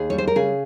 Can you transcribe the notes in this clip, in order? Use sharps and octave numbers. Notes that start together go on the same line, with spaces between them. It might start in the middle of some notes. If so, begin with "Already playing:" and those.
Already playing: D#2 G#4
G3 C#5
C5
A#4
C#3 G#4